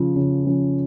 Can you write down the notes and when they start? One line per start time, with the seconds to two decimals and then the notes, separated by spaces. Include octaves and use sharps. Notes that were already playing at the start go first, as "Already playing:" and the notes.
Already playing: C#3 F3 C#4
0.16 C#3
0.45 F3 C#4